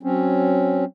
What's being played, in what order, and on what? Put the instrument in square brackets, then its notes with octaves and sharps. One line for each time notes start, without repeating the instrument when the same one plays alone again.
[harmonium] F#3 C4 C#4